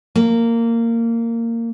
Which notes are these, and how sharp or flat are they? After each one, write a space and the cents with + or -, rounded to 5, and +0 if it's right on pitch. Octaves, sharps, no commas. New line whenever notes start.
A#3 -15